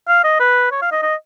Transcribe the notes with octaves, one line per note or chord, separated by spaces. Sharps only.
F5
D#5
B4
C#5
F5
D#5
D#5